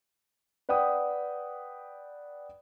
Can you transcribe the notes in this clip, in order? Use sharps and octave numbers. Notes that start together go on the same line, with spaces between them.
B4 D5 F#5 G5 D#6